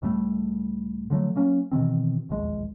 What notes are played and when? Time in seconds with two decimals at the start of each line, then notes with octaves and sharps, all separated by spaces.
0.02 C#2 A2 G3 A3
1.10 D3 F3 F#3 A3
1.35 F#3 A#3 C#4
1.72 B2 D#3 E3 C4
2.29 E1 A#1 D#2 G#3